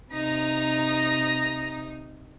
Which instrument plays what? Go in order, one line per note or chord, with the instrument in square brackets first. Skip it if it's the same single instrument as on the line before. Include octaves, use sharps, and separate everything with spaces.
[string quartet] C3 D#4 D#6 [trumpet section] A#5